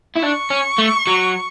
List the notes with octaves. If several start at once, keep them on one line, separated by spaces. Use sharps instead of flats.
E4
D4 C#6
C#4
A3
F#3